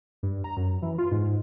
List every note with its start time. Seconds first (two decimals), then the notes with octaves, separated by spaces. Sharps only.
0.23 G2
0.44 A#5
0.57 F#2
0.82 E3
0.98 F4
1.12 G#2